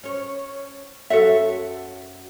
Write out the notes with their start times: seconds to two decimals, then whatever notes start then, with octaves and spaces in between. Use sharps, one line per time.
0.03 C#4 C#5
1.10 F#2 F#4 A4 C#5 E5